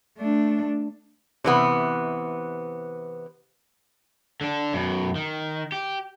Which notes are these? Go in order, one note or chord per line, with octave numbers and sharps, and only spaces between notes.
A3 D4
C3 E3 B3
D3 D4
F#2 B2
D#3
G4